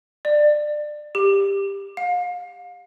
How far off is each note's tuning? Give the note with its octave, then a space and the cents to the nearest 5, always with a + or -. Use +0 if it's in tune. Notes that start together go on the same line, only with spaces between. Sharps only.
D5 +25
G4 +15
F5 +35